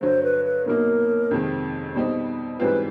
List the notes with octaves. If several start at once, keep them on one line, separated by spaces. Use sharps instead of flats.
G2 D3 F#3 C5
B4
B4
B2 F#3 A#3 D#4 A#4
F2 C3 D#3 G#3 C4
B2 G3 C4 D#4
G#2 E3 G3 C4 F4 B4